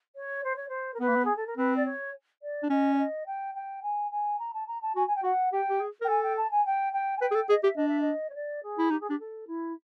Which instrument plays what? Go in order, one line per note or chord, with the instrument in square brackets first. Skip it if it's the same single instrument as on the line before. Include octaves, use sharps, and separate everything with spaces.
[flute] C#5
C5
C#5
C5
A#4
[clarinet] B3 [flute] B4
[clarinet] A#3
B3
[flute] G#4
A4
A#4
[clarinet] C4 [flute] B4
[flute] D5
C#5
D5
[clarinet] D4
[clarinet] C#4 [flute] D#5
[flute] D5
D#5
G5
G5
G#5
G#5
A#5
A5
A#5
A5
[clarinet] F#4 [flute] G#5
[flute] G#5
G5
[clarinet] F#4 [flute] F#5
[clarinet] G4 [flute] G5
[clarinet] G4
G#4
A#4
[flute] G5
[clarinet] A4 [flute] G#5
[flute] G5
A5
G#5
G5
G5
G#5
[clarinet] B4 [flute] G5
[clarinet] G#4
A4
[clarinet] G#4 [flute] D#5
[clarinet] G4 [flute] E5
[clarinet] D4 [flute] D#5
[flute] E5
D#5
C#5
D5
G#4
[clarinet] E4
[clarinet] D#4 [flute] G4
[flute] G#4
[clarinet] D4 [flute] G4
[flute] A4
E4